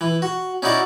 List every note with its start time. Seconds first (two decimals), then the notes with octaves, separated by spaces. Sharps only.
0.01 E3
0.22 F#4
0.62 C#4 D#4 E4 F#4 D5